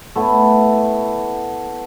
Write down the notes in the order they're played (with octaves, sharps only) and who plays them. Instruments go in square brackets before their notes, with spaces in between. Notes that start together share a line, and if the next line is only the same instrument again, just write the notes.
[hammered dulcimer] A3 B3 E4